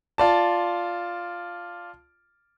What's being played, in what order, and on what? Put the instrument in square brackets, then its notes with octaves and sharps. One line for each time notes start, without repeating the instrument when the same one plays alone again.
[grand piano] F4 D5 A5